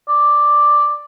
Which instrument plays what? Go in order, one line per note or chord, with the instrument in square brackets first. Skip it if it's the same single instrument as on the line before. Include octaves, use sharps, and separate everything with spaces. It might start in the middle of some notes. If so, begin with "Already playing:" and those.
[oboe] D5